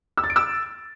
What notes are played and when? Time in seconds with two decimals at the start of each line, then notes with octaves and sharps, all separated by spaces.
0.17 E6
0.24 A6
0.30 D7
0.36 E6